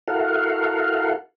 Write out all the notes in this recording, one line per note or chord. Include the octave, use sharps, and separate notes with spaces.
E4 F#4 A4 A#4 F5 F#5